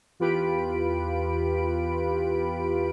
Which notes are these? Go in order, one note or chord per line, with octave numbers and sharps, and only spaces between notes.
E2 F4 G4 B4 B5 D7